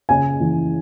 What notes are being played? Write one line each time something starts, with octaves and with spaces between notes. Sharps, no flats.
C#3 G#5
E3